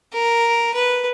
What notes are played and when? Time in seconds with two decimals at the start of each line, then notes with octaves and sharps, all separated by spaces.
0.13 A#4
0.74 B4